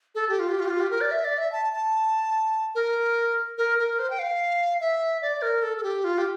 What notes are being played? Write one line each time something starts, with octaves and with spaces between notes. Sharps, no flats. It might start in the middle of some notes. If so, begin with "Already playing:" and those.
A4
G4
F4
G4
F4
G4
F4
G4
A#4
D5
E5
D5
E5
A5
A5
A#4
A#4
A#4
C5
G5
F5
E5
D5
A#4
A4
A4
G4
F4
G4